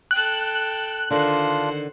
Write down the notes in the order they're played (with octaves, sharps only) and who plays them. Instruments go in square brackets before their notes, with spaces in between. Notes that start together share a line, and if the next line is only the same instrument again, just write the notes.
[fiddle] A4 G5 [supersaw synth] F#6
[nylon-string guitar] D3 D#3 [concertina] D4 F4 [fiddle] C5 F#5